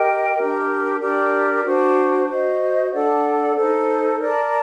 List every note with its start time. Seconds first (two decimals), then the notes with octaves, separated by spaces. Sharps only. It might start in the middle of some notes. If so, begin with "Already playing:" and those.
Already playing: G4 A#4 D#5 G5
0.35 D4 G4 A#4
1.00 D4 G4 A#4 D5
1.64 D4 F#4 C5
2.28 F#4 C5 D#5
2.92 D4 A4 D5 F#5
3.56 D#4 A4 C5
4.20 A#4 D5 A5